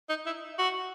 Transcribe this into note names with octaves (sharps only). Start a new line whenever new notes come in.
D#4
E4
F#4